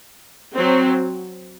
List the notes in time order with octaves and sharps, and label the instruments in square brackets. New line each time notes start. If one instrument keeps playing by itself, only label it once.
[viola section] F#3 C4